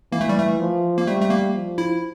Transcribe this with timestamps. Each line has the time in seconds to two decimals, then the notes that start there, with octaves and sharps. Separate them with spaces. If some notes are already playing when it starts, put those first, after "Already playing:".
0.12 E3 A#3
0.21 A3
0.29 G3
0.38 A3
0.60 F3
0.98 A#3
1.07 G3 A3
1.22 A3
1.30 A#3
1.55 F3
1.78 E4